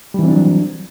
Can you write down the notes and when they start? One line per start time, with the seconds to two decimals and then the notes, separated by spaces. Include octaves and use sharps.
0.14 G3
0.19 E3
0.24 C4
0.28 D4
0.33 F#3